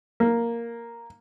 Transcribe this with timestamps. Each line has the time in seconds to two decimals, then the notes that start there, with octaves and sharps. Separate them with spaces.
0.20 A#3